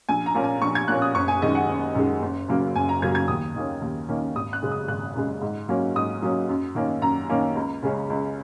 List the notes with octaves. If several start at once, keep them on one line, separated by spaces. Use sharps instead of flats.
A#1 G#5
A#5
A#2 A#3 C#4
G#5
A#1 C#6
G#6
A#2 A#3 C#4 F#6
D#6
F#1 C#6
G#5
F#2 D#3 G#3 D#5
F#5
F#1
F#2 D#3 G#3
F#1
F#2 C#3 F#3 A#3
F#1 G#5
A#5
F#2 C#3 F#3 A#3 G#6
G#6
D#2 D#6
D#3 A#3 C#4
D#2
D#3 A#3 C#4
G#1 D#6
F#6
F#2 C#3 G#3
D#6
G#1 F#6
F#2 C#3 G#3
G#2
F#3 A#3 C#4
G#2 D#6
F#3 A#3 C#4
F#2
D#3 A#3 C#4
F#2 A#5
D#3 A#3 C#4
C#2
C#3 G#3 C#4
C#2